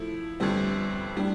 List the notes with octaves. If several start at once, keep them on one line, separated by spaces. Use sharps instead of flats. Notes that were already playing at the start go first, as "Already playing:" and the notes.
Already playing: F3 A3 E4
G1 F2 D3 G3 C4
A2 G3 D4